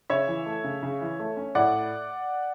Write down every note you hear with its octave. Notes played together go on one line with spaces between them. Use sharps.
C#3 C#5 E5
E3
A3
C#3
C#3
E3
A3
C#4
A2 D5 F#5